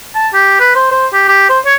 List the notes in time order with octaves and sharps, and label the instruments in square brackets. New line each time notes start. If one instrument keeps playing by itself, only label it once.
[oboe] A5
G4
B4
C5
C5
G4
G4
C5
C#5